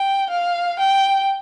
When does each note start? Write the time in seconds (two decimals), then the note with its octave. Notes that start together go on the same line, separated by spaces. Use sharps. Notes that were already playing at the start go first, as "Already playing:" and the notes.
Already playing: G5
0.30 F5
0.79 G5